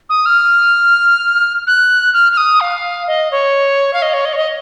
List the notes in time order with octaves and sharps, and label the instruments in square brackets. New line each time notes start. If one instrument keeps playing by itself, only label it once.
[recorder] D#6
F6
F#6
F6
F6
D#6
F5
D#5
C#5
F5
D#5
C#5
D#5
C#5
D#5